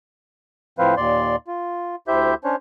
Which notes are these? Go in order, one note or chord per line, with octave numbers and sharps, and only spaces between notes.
A2 F3 C4 B4 C5 F5
D#2 A#2 D5 C6
F4
D2 E4 G4 C5 E5 G6
C#4 D4 C5 C#5